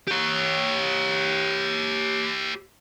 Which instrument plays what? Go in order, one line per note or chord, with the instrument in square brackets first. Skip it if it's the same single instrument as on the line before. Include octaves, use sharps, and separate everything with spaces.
[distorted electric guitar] G4 C#5